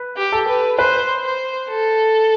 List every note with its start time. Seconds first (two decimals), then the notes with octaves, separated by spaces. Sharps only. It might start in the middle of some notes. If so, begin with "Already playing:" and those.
Already playing: B4
0.17 G4
0.32 A4
0.48 B4
0.78 B4 C5
1.23 C5
1.69 A4